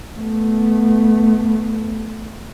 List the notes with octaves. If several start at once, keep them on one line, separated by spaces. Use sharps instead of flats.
A3 B3